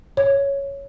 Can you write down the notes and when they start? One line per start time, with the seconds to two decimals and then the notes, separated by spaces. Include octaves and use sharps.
0.17 C#5